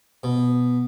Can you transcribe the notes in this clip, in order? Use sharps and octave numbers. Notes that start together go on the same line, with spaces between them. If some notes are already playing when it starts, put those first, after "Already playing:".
B2